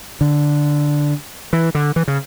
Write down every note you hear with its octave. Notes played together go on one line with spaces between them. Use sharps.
D3
E3
D3
E3
C#3